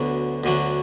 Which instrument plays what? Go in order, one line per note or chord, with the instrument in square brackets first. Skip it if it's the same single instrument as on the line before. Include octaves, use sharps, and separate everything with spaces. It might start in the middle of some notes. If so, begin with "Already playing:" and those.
Already playing: [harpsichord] D2 D3 F#3 [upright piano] B3
[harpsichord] D2 D3 F#3